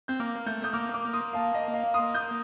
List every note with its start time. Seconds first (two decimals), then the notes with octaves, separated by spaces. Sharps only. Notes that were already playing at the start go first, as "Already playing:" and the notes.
0.08 C4 G6
0.20 A#3 D6 F6
0.46 A3 G6
0.64 D#6 G6
0.73 A#3 D6 F6
0.94 D6 F6
1.13 C6 D#6
1.33 F5 A5
1.54 D#5
1.74 F5
1.94 C6 D#6
2.14 D#6 G6